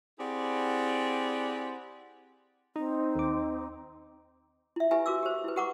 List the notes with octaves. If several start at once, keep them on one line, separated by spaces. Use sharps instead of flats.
C4 E4 G4 G#4 D5 F#5
C4 D#4
D#2 D6
E4 E5
E4 G4 B4 E5 G#5 A#5
F#4 A#4 D6 E6
G4 C5
E4 B4
G4 A#4 F#5 A#5 C#6 D6